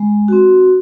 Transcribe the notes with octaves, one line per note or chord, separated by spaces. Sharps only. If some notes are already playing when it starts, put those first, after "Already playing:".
Already playing: G#3
C4 F#4